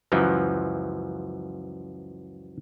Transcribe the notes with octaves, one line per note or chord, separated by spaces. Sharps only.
C#2 F#2 E3 F3